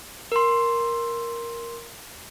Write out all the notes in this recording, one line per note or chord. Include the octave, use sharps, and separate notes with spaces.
A#4 C6